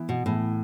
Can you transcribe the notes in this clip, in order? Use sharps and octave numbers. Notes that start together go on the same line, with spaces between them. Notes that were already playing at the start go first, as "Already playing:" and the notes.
Already playing: E3 B3 E4
B2
A2 E3 B3 E4